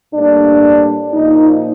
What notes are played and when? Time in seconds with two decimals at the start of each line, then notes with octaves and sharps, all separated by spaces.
0.14 A2 G3 A#3 D4
1.13 A#2 F3 A#3 D#4